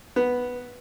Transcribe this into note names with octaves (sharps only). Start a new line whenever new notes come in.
B3